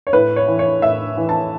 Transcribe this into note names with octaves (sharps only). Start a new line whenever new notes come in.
C#5
A2 B4
C#5
E3
C#5
A2 E5
E3
A5